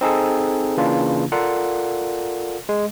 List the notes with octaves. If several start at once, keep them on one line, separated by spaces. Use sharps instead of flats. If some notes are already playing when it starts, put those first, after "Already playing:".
C4 D#4 G#4 A4
C#3 E3 A#3 D4 F4
F4 A4 A#4 D5 F5 F#5
G#3